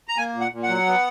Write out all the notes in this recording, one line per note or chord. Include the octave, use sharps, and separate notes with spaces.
A#5
A#3 G#5
A#2
F#5
A#2
F#5
F#3
B3